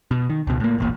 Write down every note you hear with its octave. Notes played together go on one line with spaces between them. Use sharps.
B2
D#3
C#2 B2
A2 A#3
E1 A1 A#2